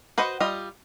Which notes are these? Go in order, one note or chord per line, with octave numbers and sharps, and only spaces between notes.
F#4 B4 C5 D#5 F#5
G3 F4 D#5